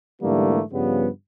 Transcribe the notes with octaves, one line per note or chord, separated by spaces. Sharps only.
G#2 D3 E3 G3 A3 A#3
G2 C#3 F3 G3 B3